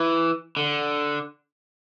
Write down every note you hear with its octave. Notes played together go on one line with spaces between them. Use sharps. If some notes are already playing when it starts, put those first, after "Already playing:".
Already playing: E3
D3